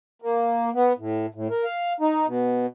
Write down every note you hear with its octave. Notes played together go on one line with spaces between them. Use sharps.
A#3
B3
A2
A2
A#4
F5
D#4
B2